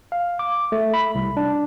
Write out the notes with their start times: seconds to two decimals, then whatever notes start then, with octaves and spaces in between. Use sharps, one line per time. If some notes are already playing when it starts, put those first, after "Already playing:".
0.12 F5
0.39 D6
0.72 A3
0.94 B5
1.15 C2
1.37 D4